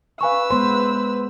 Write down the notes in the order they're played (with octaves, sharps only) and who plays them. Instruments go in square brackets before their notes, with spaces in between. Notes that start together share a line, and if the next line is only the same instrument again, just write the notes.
[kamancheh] B4 E6 [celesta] F5 G#5 C#6
[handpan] G#3 B3 C5 [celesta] C6